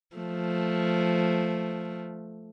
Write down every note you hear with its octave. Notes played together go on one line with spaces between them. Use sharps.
F3 A3